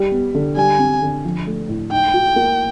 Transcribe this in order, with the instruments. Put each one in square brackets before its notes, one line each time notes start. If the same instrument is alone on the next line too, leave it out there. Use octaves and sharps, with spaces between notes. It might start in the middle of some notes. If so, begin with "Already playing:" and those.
Already playing: [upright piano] G3
B3
D3
[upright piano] G3 [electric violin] G#5
[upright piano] C4
D3
F3
A3
A2
[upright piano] D#4 [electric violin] G5
[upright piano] F#4
A#3